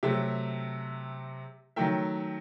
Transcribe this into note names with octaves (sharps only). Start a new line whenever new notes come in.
C3 F#3 A3 E5 G5
D#3 F#3 A3 E5 G5